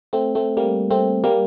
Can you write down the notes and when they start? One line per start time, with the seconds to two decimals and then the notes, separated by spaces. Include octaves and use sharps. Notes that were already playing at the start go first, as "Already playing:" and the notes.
0.13 A3 C4
0.35 A3 C4
0.57 G3 A#3
0.90 A3 C4
1.24 G3 A#3